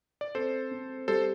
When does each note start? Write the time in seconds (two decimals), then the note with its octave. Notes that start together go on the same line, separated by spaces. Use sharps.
0.21 D5
0.35 C4 A4 C5
0.71 C4
1.08 G3 A4 C5